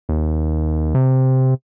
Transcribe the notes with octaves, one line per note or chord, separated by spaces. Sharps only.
D#2
C3